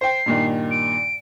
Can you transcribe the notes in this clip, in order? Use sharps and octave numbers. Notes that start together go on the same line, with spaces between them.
C5 G5 C7
G2 A#2 D#3
D7